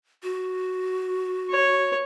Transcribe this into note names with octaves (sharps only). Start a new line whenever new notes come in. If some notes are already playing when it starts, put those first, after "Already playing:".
F#4
C#5